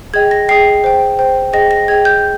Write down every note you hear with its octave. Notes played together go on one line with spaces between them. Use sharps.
G#4 D#5 G5 G#6
A#6
G#4 D#5 G5 C7
C5 G5
C5 G5
G#4 D#5 G5 A#6
A#6
G#4 D#5 G5 G#6
G6